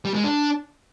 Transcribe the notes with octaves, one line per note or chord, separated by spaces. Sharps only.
G3
G#3
D4